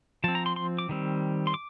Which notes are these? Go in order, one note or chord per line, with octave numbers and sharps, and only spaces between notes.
F3 C4 A5
A#5
C6
C6
D6
D#3 G3 C4
C6
D6